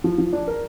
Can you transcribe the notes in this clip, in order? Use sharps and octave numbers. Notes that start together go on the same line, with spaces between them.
F3
F3
D4
A#4